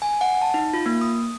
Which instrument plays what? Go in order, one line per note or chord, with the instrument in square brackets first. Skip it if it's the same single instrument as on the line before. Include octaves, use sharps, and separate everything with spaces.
[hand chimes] G#5
F#5
A5
D#4
F4
A#3
D#6